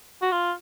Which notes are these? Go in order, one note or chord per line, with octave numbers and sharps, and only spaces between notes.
F#4
F4